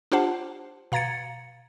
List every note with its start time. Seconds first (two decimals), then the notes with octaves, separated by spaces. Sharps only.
0.12 D4 F4 G4 C5 F#5 A5
0.92 B2 F5 A#5 G#6 A6 C#7